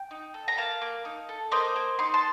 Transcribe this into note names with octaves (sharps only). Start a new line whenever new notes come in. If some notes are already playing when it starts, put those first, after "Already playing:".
Already playing: G5
D#4
A4
A#5
A#3 F5 A5
A#3
D#4
A4
A#3 C5 D#5
A#3
D#4 C6
A5 C6